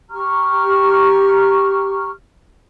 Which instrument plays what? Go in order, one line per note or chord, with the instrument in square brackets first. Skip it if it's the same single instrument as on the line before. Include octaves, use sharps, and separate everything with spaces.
[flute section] G4 A#5 C#6 F6